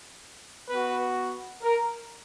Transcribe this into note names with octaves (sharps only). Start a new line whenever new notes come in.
B3 F#4 B4
A#4